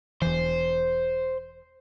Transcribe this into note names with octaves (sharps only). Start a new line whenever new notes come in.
E1 E3 C5